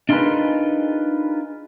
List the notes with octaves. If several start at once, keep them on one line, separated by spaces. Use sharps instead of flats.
D4 D#4 F4 G#4 A#4 B4